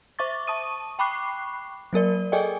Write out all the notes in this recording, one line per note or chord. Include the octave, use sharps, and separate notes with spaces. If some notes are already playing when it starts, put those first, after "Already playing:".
C5 E5 C#6 D6 A6
A5 C#6 D#6 D#7
G5 B5 C#6 D6 F#6 C7
F#3 A#3 A#4 D5
G#4 A4 D5 D#5 G5 G#5